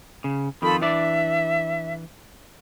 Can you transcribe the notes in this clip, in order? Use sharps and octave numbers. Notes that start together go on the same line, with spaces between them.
C#3
F2 D#3 F4 A4 B5
E3 D4 D5 E5